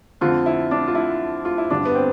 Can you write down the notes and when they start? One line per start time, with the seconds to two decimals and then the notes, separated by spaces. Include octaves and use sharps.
0.21 F2 D3 F4
0.46 E4
0.71 D4
0.88 F4
0.95 E4
1.45 F4
1.58 E4
1.70 G2 D3 D4
1.85 B3
1.95 C4